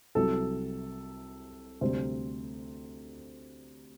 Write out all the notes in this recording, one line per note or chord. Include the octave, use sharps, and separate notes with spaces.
C2 C3 F#3 A4
D2 C3 G3 C5